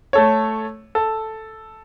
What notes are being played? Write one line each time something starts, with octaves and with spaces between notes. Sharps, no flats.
A3 A4 C#5
A4